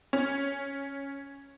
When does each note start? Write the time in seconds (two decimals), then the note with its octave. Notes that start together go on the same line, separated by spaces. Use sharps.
0.13 C#4